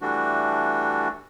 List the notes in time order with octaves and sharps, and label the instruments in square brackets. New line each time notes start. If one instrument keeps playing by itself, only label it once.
[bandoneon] E3 G3 A3 D4 F#4